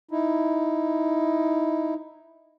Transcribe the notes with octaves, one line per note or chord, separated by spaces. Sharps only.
D#4 E4